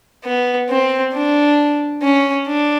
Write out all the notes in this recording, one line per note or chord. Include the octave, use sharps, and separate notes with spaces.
B3
C4
D4
C#4
D4